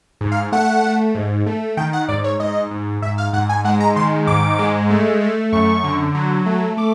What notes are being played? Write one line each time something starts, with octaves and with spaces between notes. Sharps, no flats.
G#2
F5
A3 F#5
A3
G#2
A3
D#3 G5
F#5
G#2 D5
C#5
G#2 D#5
G#2
G#2 E5
F5
G#2 F#5
G#5
G#3 F#5
A#5
D#3 C6
G#2 D6
G#3
A3
A3
F#2 C#6
D3
F#3
A3
A3 D6